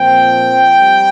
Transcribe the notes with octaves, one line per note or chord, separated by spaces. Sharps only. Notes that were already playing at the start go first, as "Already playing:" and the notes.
Already playing: A#2 F3 C4 G5
G3 C4